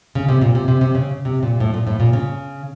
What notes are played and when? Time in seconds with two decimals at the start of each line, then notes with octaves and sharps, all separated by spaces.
0.15 C#3
0.29 C3
0.42 A#2
0.55 C3
0.68 C3
0.81 C3
0.95 C#3
1.25 C3
1.43 A#2
1.60 A2
1.74 A#2
1.87 A2
2.00 A#2
2.13 C#3